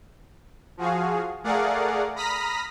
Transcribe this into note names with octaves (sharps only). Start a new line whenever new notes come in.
F3 F#4 G#4 F5
A3 G#4 A#4 D5 F5 F#5
A#5 B5 D#6 F6 A#6 B6